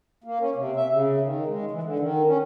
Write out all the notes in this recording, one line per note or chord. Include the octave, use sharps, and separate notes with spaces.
A#3
C#4
C3
E5
C#3
D#3
G#3
E3
D3
D#3
C#4